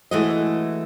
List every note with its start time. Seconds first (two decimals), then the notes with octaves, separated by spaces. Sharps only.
0.11 E3 G#3 A3 F#4 D#5